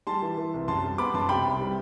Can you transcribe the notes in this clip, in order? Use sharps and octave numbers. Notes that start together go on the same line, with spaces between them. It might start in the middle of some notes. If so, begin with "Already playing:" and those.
G3 A5 C6
E3
E3
C2
F#2 A5 C6
G3
B3 B5 D6
F#2 A5 C6
C3 G5 B5
C2
G3